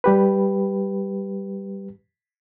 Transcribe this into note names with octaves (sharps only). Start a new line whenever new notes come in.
G3 G4 B4